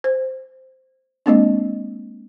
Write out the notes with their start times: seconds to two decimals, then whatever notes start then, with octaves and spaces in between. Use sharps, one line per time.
0.04 C5
1.26 G#3 A#3 C4 D4